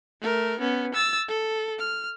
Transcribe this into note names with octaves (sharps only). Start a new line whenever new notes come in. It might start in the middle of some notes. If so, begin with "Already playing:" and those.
A3 A#4
B3 C#4
E6 A6
A4
F6